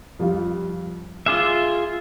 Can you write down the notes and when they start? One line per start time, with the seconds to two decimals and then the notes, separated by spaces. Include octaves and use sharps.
0.19 F2 G3 F4
1.26 F4 G#4 E5 D6 F6